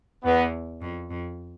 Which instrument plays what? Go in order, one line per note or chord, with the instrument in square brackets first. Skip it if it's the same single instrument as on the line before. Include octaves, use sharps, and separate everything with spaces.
[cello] E2 [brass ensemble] B3
[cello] F2
F2